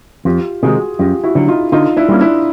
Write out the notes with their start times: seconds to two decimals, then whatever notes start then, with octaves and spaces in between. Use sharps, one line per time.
0.25 F2 F4 G4
0.63 C3 D#3 G#3 F#4 G#4
0.99 F#2 F4 G4
1.24 E4 F#4
1.35 D3 F#3
1.48 D#4 F4
1.72 D3 D#4 F4
1.97 D4 E4
2.09 G3 A#3 C#4
2.21 D4 E4